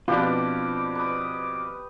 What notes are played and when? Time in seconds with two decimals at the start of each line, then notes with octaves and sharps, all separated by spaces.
0.08 B2 F3 C4 D4 F4 G4 B4 D6
0.95 B4 D6 D#6